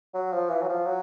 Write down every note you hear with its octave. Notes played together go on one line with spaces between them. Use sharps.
F#3
F3
E3
F#3
F3
F#3